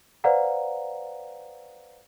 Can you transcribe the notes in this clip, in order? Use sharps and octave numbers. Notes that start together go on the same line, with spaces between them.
B4 C5 D5 F5 F#5 A#5